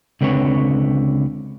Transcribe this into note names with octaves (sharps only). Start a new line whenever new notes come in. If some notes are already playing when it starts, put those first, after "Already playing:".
C#2 D3 C4 B4 C#5